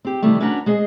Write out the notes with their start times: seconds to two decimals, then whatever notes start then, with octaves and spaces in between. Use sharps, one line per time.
0.05 C4 G4
0.22 C3 D#3 E3 G3 A3
0.40 C#4 D4 F#4 B4 F#5 A#5
0.66 G#3 G#4 C5 D#5